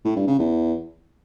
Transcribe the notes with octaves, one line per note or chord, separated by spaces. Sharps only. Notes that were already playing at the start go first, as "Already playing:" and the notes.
A2
G2
C#3
E2